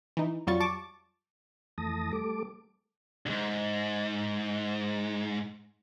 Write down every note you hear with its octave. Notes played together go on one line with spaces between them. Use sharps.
E3 D#4
F2 F#3 G3 F4 C#6 A6
A5 C#6 D6 A6
F2 E3 A3 A5 D#6 A#6
G3 A3 A4 D6
D2 G#2